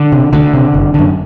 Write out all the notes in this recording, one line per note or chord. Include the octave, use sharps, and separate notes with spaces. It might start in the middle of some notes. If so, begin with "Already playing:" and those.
Already playing: D3
C3
D2 D3
C3
F#1
F#2 D3